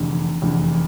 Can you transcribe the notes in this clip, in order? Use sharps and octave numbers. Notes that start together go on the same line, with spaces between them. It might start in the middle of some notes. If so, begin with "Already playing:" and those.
Already playing: F1 E2 D3
F1 E2 D3